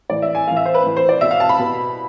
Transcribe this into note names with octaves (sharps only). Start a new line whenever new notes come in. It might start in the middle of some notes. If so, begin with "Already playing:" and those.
A2 E3 D5
E5
G#5
A2 E3 F5
E5
C5
B4
A2 E3
C5
D5
B2 E5
F5
A5
B5
B2